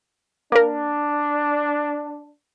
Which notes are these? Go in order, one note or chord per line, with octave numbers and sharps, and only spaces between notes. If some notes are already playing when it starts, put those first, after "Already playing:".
A#3 D4 A#4